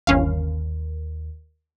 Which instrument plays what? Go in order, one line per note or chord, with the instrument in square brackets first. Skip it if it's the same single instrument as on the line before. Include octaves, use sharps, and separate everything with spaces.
[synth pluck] G1 C#4 F5 [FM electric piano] D#2